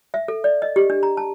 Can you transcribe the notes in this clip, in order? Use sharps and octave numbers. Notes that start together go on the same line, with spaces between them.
E5
A4
D5
D#5
G4
D4
A#5
A5